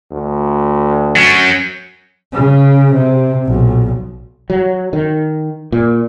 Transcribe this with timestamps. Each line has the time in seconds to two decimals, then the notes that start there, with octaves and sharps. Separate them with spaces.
0.11 D2
1.16 F#3 C#4
2.32 C#3
2.94 C3
3.45 B1 A#2
4.50 F#3
4.93 D#3
5.72 A#2